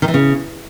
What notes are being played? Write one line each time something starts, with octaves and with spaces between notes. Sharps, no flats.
D#3
E3
C#3